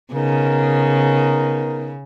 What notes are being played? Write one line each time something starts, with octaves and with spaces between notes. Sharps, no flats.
C#3 B3 D#4 A#4